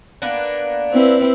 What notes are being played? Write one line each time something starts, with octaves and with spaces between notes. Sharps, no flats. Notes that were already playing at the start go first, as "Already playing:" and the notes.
A#3 B3 D4
C4 E4 B4